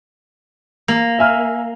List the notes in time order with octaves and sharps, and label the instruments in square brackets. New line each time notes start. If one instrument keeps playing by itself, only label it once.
[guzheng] A#3
[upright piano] E5 G#5 F6